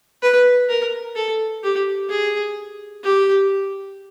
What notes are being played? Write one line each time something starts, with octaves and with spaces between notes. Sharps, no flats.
B4
A#4
A4
G4
G#4
G4